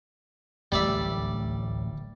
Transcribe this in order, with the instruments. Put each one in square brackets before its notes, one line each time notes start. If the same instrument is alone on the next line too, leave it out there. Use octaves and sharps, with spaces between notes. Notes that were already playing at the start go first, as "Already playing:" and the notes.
[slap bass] D1 A1 D#2 [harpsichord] G3 D5 E5